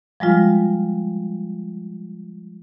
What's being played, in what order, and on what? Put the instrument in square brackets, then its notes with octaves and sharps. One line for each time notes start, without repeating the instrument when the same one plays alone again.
[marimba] F3 G3 G#3 F4